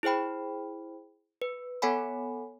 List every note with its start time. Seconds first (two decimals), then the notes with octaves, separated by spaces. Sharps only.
0.03 E4 G#4 C5 G5 B5
1.42 B4
1.82 B3 A4 C#5 F#5 G#5 B5